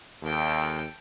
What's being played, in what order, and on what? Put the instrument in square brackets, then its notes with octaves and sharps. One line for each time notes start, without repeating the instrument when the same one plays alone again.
[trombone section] D#2 [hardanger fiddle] A4 G5